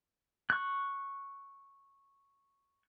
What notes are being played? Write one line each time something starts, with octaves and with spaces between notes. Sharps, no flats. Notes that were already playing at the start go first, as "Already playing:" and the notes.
C#6 F#6